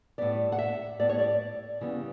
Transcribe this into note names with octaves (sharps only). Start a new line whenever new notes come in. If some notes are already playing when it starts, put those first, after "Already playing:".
A2 G3 B3 D5
F#5
E5
A2 G3 B3 D5
C#5
D5
C#3 E3 G3 B3